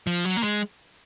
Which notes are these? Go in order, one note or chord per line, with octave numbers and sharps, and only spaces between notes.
F3
F#3
A#3
G#3